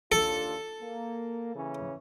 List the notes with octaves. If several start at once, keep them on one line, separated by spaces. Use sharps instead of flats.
D#2 D4 F4 A4
A#3
C#3 E3 C#4